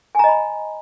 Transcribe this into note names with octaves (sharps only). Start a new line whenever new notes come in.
D#5 G#5 A#5 B5